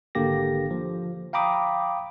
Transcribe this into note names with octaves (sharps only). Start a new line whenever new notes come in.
G#1 D3 A#3 G4 A#6
F3
F5 G5 A#5 B5 D6 D#6